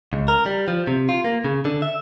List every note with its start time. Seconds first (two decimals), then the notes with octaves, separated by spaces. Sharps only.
0.13 C#2
0.28 A#4
0.46 G3
0.68 F3
0.87 C3
1.09 F4
1.24 A#3
1.44 C#3
1.65 D3
1.82 E5